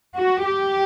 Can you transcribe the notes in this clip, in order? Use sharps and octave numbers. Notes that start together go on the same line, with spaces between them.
F#4
G4